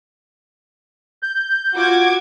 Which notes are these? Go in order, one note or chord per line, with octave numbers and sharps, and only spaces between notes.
G6
F4 F#4 D6 G#6